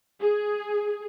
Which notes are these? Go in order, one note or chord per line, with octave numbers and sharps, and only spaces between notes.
G#4